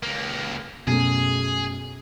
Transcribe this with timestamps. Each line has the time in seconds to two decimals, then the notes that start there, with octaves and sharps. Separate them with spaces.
0.03 C#2 A#3
0.87 F#2 B2 A3 G#4